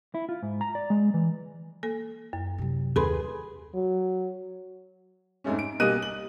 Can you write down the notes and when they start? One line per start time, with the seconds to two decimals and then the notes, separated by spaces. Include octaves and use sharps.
0.14 E4
0.29 F4
0.42 G#2
0.61 A#5
0.75 D5
0.90 G#3
1.14 E3
1.83 A#3 A4
2.33 F#2
2.58 C3 F#3
2.96 D#2 G#4 A4 B4 B5 C6
3.74 F#3
5.44 F2 G#2 A3 C#4
5.59 D7
5.80 B1 G3 A#3 D#5 F#6 D#7
6.02 F#7